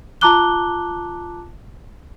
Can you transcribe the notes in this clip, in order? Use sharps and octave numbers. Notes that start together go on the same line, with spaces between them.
F4 A5 A#5 D6 F#6 G7